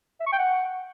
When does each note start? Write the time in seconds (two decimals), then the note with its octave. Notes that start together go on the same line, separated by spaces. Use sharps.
0.20 E5
0.26 C#6
0.32 G5
0.38 F#5